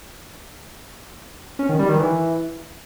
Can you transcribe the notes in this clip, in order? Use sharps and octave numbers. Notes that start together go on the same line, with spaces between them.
C#4
D#3
G3
D#3
E3